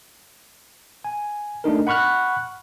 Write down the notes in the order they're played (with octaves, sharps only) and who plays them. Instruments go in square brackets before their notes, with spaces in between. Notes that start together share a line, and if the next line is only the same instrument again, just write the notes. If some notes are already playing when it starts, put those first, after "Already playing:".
[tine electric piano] G#5
A3 D4 D#4 A#4
F#5 B5 C#6 F6 F#6